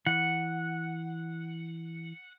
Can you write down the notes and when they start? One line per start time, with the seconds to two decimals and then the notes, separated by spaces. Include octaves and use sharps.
0.06 E3 F#5